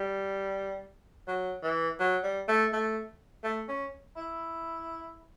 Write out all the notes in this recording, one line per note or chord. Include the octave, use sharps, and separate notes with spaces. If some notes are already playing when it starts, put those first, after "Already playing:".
Already playing: G3
F#3
E3
F#3
G3
A3
A3
A3
C#4
E4